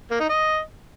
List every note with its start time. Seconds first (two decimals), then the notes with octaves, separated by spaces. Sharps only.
0.11 A#3
0.20 D#4
0.29 D#5